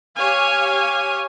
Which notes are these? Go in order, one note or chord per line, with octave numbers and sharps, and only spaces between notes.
G4 C#5 F5 G#5